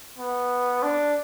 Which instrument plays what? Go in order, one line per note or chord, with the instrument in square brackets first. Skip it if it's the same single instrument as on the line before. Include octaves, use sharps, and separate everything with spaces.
[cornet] B3
D4